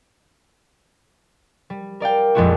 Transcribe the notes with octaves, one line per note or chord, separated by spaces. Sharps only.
G3
A#4 D5 F5 G5
A#1 F2 F3 G#3 E4 F#4